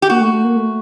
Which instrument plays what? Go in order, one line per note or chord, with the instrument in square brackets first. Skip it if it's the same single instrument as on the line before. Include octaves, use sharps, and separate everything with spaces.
[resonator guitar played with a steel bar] G4
[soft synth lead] A#3 [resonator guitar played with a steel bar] F#4
[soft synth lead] A3
A3
A#3
A3